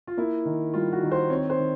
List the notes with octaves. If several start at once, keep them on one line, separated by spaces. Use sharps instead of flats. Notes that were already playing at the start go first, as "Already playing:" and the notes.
F4
A#3 E4
D#3
G3 F4
F#4
D#3
C5
C4 C#5
C5
D#3